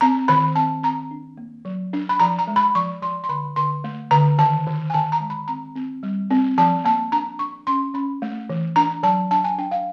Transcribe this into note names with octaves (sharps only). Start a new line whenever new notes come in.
C4 A#5
D#3 B5
C4 A5
C4 A#5
D4
A#3
F#3
D4
B5
F3 A#5
A#5
G#3
B5
F3 C#6
F3 C6
C6
D3 B5
D3 C6
A3
D3 A#5
D#3 A5
D#3
G#5
D#3 A5
A#5
G#3
B5
C4 A#5
C4
G3
C4
F3 A5
A#3 A5
D4 A#5
D4 C#6
C#4 C6
C#4 B5
A3
E3
D4 A#5
F#3 A5
D4 A5
G#5
D4 G5
F5